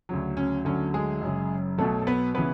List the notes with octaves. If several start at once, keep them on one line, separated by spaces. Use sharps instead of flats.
D2 C#3 F#3
C#4
D2 D3 F#3 C#4
G#3 G#4
F#1 F#2 C#3
B1 B2 F#3 A3 A4
A4
B3 B4
C#3 E3 B3 B4